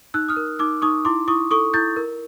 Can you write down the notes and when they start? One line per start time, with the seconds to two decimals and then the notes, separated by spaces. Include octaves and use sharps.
0.14 D#4 E6 F#6
0.28 D#6 F6
0.36 A#4
0.59 D#4 D6 E6
0.82 D#4 C#6 D#6
1.05 E4 C6 D6
1.28 E4 C#6 D#6
1.51 A4 C#6 D#6
1.74 E4 G6 A6
1.96 A#4